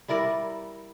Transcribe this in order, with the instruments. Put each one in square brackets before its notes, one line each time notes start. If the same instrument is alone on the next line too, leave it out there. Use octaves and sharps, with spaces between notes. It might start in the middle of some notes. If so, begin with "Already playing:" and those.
[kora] G3 E4 A#4 D5